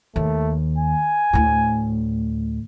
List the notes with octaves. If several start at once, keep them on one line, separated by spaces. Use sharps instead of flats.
D#2 A3
G#5
D2 A2